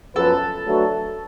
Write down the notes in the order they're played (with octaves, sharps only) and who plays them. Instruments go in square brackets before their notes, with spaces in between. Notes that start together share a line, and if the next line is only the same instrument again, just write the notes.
[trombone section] F#2 F3 B3 F4 B4 [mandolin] A4
[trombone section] F#3 A3 D4 F#4 B4